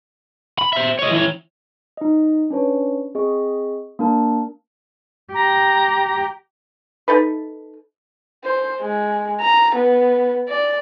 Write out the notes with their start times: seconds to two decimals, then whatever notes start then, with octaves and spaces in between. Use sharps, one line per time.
0.59 B5
0.73 C5 E5
0.99 C#5 D#5
1.11 E3 C#5
1.97 D#4 D#5
2.50 C#4 D4 B4 C#5
3.15 C4 G#4 D#5 C#6
3.99 A#3 D4 A#4 A5
5.33 G4 A#5
7.08 D#4 A4 B4
8.44 C5
8.81 G#3
9.40 A#5
9.76 B3
10.48 D5